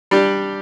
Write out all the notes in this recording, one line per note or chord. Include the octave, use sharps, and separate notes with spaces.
G3 D4 G4